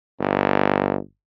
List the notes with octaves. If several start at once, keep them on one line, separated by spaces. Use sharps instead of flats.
G1